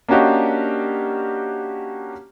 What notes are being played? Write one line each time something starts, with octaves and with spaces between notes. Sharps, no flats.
A#3 C#4 D4 F#4 G4 D#5